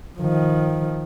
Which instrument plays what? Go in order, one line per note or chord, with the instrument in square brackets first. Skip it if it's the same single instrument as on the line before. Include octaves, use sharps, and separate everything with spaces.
[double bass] D#3 F3